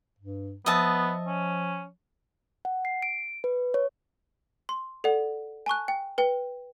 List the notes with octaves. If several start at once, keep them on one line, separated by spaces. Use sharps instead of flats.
G2
F3 B3 D#5 E5 A5
C#4
F#5
C7
D7
B4
C#5
C6
A4 D5 F#5
G#5 A5 C#6 F#6
G5
B4 G5